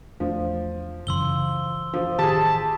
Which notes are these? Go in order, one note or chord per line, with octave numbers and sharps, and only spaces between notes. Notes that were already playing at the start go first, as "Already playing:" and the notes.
E2 F3 A3 D4
F#2 C#3 E3 C6 E6 G7
F3
A1 D#3 G4 G#4 A5